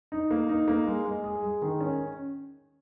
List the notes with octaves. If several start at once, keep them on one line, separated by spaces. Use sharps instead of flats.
D#4
A#3
D#4
A#3
G#3
G#3
G#4
G#3
D#3
C#4